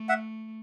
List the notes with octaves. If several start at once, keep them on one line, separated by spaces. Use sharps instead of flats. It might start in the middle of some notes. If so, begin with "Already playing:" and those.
Already playing: A3
E5 F#5